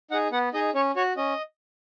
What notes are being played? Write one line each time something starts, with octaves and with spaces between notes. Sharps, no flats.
D#4 G#4 F#5
B3 F#5
D#4 G#4 D#5
C#4 C#5
F#4 C#5
C#4 D#5